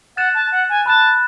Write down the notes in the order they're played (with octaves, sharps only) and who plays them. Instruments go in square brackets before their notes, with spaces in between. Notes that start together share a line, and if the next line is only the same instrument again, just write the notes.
[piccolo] F#5 [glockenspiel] F#6 A6 E7
[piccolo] A5
F#5
G#5
[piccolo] A5 [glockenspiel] B5 F#6 A6 E7